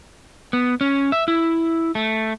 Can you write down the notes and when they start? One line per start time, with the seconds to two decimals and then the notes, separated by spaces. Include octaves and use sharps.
0.53 B3
0.81 C#4
1.12 E5
1.28 E4
1.95 A3